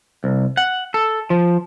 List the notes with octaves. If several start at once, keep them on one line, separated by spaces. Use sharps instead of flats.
C2
F#5
A4
F3